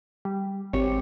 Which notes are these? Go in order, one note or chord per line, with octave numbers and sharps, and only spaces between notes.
G3
G#1 C4 G4 C#5